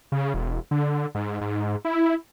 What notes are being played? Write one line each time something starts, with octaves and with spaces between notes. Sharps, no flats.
C#3
E1
D3
G#2
G#2
E4